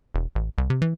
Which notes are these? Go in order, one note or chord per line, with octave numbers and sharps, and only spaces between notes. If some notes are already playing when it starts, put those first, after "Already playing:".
E1
A1
C2
C3
E3